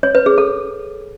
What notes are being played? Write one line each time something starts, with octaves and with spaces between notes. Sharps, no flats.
C#5
B4
G#4
A4